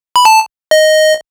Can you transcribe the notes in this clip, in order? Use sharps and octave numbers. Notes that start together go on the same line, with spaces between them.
B5
A5
D#5